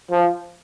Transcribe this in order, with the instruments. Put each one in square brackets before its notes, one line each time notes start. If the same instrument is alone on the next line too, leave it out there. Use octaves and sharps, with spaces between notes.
[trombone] F3